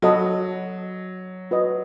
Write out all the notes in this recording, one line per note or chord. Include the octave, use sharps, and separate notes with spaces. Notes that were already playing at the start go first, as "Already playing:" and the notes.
F#3 F#4 A4 D#5 F#5 B5
F#4 B4 D#5